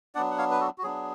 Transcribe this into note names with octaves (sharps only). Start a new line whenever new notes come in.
F#3 B3 D4 D5 F#5
F#5
C#5 F5
B4
F#4 A4
F#4
F#3 B3 D4 G#4